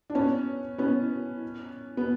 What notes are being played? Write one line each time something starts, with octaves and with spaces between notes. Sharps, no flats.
D4
B3 C#4
B3 C#4
B3